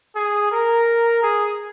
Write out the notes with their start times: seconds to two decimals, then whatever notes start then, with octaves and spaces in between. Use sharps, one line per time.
0.16 G#4
0.52 A#4
1.23 G#4